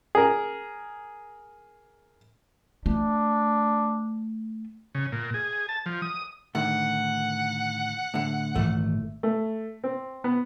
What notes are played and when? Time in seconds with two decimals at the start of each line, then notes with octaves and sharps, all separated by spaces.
0.15 G#4 A#4
2.86 A3 D4
4.95 C#3
5.12 A#2
5.34 G#4
5.69 A5
5.86 F3
6.02 D#6
6.55 A2 D3 D#3 F#5
8.14 A2 D3
8.56 G#1 A#2 E3 A3
9.23 A3
9.84 C4
10.24 B3